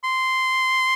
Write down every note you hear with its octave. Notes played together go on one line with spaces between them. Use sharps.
C6